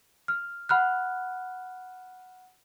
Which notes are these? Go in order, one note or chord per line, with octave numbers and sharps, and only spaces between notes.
F6
F#5 B5 F6 F#6